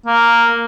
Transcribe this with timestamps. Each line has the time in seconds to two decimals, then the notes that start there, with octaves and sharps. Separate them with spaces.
0.06 A#3